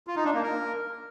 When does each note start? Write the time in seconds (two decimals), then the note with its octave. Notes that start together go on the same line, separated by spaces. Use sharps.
0.07 F4
0.16 D#4
0.25 D4
0.34 A#3
0.43 A#4